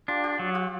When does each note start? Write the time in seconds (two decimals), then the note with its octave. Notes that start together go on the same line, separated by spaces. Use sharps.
0.08 D4 F4 G4
0.24 F4 G4
0.39 F#3
0.54 F4 G4